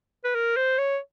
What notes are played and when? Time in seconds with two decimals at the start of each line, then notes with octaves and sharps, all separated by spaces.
0.24 B4
0.35 A#4
0.57 C5
0.78 C#5